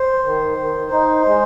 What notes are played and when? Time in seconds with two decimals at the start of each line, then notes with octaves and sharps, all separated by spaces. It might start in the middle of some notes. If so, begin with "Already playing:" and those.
Already playing: C5
0.25 D#3
0.58 D#3
0.91 D#4
1.26 G#3